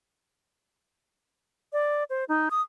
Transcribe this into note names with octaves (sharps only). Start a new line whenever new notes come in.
D5
C5
D#4
D#6